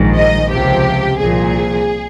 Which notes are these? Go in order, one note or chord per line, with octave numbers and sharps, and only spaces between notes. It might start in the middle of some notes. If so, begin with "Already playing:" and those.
Already playing: A#1 G#2 D#3
D#5
C#2 C3 F3 G4
C2 A#2 F3 G#4